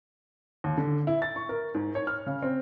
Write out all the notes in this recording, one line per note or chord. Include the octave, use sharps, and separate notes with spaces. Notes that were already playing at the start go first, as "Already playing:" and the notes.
D#2
D3
E4
A6
C#6
A#4
G#2
C#5
F6
C#3
C4